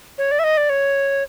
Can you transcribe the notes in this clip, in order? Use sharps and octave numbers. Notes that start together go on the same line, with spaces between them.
C#5
D5
E5
D#5
D5
C#5